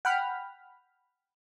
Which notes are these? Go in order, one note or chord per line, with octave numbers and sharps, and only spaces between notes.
F#5 G5 B5 F6